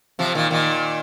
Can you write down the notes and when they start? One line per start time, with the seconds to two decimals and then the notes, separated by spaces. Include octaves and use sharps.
0.19 C3 F3
0.35 A#2 D#3
0.50 A#2 D#3